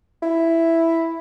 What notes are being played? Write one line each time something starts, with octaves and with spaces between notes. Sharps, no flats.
E4